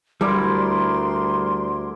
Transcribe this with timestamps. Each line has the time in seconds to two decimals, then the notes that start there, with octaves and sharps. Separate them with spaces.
0.21 D2 G3 E4 A#4 D5 C6